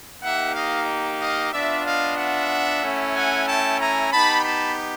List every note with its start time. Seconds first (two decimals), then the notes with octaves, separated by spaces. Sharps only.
0.24 A#3 D#4 G4 E5 F#5
0.55 D#5 F5
1.21 D#5 F5
1.53 B3 D4 F4 D5 E5
1.86 D#5 F5
2.18 E5 F#5
2.82 A3 C#4 E4
3.15 F#5 G#5
3.47 G5 A5
3.81 G#5 A#5
4.12 B3 D#4 G4 A5 B5
4.45 A5 B5